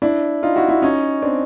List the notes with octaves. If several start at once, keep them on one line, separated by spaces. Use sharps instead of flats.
D4 E4
D#4 F4
E4 F#4
E4 F#4
C#4 D#4
C4 D4